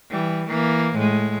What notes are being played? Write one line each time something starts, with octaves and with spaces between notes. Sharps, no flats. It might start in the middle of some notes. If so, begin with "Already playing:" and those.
E3 G3
E3 A#3
A2 G#3